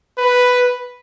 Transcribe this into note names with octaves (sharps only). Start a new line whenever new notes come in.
B4